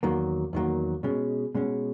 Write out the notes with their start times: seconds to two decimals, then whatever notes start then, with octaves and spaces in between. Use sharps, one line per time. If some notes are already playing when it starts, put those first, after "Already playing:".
0.03 E2 D#3 F#3 A#3
0.53 E2 D#3 F#3 A#3
1.03 B2 G#3 C#4
1.55 B2 G#3 C#4